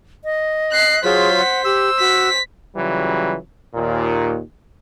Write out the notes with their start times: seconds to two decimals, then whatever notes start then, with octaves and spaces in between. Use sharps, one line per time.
0.24 D#5
0.71 F#6 C7
1.04 F#3 F4 G#4 C5 B6
1.36 F#5
1.65 G4 E6
2.00 F#4 B6
2.75 C#3 E3 F#3 G3 F4
3.75 D#2 A#2